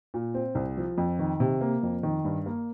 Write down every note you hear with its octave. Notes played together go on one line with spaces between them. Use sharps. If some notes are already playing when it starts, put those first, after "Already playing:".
A#2
C4
C2
F3
F2
D#3
C3
A#3
F2
D#3
G2
A#3